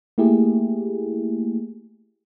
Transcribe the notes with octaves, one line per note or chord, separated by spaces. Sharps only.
A3 A#3 E4 G4 G#4